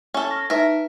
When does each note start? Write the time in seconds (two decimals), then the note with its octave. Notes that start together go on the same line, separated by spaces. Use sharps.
0.14 C#4 A4
0.31 C#6 F6 A#6
0.50 D#4 A#4 B4 E5